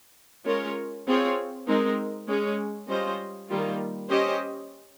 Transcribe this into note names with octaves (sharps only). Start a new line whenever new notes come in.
G#3 C#4 F4 A#4 C#5
C4 F4 G#4 C#5
G#3 C4 D#4 A#4
G#3 C#4 G#4 C#5
G3 C#4 F4 C5 D#5
D#3 G3 A#3 F4
C#4 G4 C5 D#5